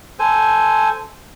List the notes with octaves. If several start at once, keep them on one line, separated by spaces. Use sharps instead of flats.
A4 C5 G#5